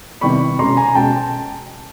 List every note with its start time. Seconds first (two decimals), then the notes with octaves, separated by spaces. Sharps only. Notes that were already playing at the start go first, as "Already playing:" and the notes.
0.21 C3 D#3 G3 B3 E4 B5 C#6
0.59 B2 G#3 C#4 A#5 C6
0.77 G#5 A#5
0.95 B2 G#3 C#4 G5 A5